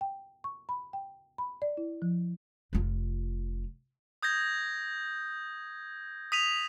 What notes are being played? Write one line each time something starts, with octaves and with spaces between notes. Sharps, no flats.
G5
C#6
B5
G5
B5
D5
E4
F3
F1 F4
D#6 G6 G#6 A#6
D#6 B6 D#7 F7